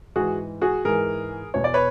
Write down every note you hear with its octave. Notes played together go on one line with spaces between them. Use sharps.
G#2 E3 F#4 G#4
F#4 G#4
G#2 E3 G#4 A#4
E2 B2 C#5
D5
B4 C#5